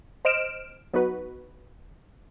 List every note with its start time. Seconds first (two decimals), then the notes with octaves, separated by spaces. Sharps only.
0.25 C5 D#5 F6 D7 E7
0.93 F#3 B3 D#4 F#4 B4